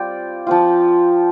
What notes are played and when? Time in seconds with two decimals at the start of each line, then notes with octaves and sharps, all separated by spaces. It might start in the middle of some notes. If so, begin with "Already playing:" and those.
Already playing: G3 C4 F4 D5 G5
0.47 F3 C4 F4